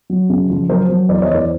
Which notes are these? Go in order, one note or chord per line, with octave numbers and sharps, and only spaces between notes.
F#3
C#3
F3
F#3 A#4 C5
F#3
E2 C5 D5
C#5 D#5
E2
C5 D5